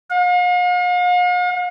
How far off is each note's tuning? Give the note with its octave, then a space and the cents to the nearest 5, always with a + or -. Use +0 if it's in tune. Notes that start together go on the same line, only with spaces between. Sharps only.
F5 +45